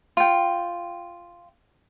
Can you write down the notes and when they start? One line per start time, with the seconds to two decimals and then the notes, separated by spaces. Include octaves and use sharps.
0.17 F4 G5